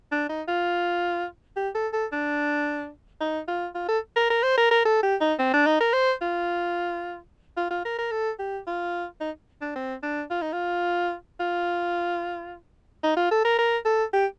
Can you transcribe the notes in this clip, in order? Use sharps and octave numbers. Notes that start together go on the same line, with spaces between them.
D4
D#4
F4
G4
A4
A4
D4
D#4
F4
F4
A4
A#4
A#4
C5
A#4
A#4
A4
G4
D#4
C4
D4
D#4
A#4
C5
F4
F4
F4
A#4
A#4
A4
G4
F4
D#4
D4
C4
D4
F4
D#4
F4
F4
D#4
F4
A4
A#4
A#4
A4
G4